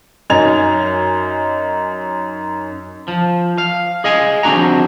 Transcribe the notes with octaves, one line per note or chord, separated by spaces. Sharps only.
F#2 D#4 G#5 G#6 F7
F3
F5
G#4 D#5 F5 G#5
F2 C4 D4 F#4 F#5 A#5